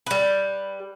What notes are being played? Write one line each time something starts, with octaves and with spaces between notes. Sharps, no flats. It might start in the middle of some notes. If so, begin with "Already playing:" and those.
G3 B4